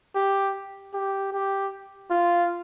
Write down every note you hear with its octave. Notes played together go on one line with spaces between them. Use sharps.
G4
G4
G4
F4